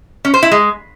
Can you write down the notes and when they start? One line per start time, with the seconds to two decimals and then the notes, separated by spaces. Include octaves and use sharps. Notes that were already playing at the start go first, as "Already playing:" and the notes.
0.25 C#4
0.34 C5
0.43 E4
0.51 G#3